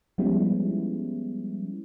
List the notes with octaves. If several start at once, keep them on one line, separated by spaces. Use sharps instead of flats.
F3 G3 G#3 B3 C#4 E4